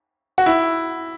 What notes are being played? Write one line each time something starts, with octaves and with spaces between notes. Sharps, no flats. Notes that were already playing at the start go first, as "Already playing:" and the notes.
F#4
E4